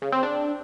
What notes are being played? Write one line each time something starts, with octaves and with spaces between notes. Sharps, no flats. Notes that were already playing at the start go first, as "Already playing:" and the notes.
C#3
C4
D4